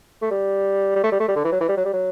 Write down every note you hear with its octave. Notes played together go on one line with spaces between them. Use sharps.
A3
G3
G3
A3
G3
A3
G3
D3
E3
F#3
E3
G3
F#3
G3
F#3